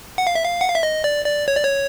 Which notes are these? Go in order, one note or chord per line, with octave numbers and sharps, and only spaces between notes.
F#5
F5
E5
F5
F#5
F5
E5
D#5
D5
D5
C#5
D5
C#5